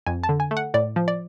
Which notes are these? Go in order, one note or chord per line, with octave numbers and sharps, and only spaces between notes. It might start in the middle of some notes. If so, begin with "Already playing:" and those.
F2 G#5
A5
D3
G#5
A3
F#5
A2 D5
F3
D5